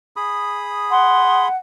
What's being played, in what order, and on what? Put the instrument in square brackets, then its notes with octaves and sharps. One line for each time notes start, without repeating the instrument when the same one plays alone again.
[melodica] G#4 B5 D#6
[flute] F#5 [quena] C6